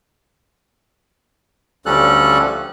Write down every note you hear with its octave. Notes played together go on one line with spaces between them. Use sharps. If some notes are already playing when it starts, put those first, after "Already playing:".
D2 F3 G3 C#4 A4 F#6